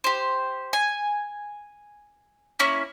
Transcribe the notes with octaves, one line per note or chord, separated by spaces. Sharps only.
G4 C5
G#5
A#3 C#4 E4